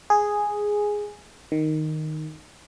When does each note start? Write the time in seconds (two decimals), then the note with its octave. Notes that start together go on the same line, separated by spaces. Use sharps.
0.10 G#4
1.52 D#3